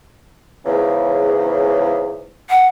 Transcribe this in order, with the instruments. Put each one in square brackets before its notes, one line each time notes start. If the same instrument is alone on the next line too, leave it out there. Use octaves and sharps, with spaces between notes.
[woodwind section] E2 G#2 C#3
[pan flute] F#5